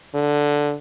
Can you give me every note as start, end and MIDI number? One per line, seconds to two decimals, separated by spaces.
0.14 0.74 50